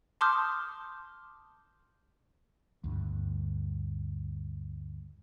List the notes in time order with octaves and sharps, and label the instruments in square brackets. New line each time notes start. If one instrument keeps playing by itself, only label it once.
[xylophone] A5 C6 D6 D#6 F6 G6
[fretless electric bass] D2 G2